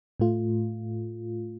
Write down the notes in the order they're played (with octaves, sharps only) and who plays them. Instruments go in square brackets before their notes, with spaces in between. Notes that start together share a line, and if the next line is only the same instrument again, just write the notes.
[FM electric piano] A2 A3 F4